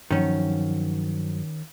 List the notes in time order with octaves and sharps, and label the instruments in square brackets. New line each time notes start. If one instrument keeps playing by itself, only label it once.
[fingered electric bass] G2 F3 F#3 [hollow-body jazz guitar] D#3 C#4